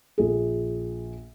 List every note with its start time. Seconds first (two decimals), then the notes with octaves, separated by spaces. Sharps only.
0.18 A#1 G#4